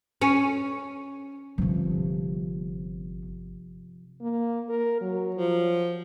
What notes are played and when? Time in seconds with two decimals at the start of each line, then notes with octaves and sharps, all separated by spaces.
0.21 C#4
1.58 G1 C3 F3
4.21 A#3
4.69 A#4
5.01 F#3
5.35 F3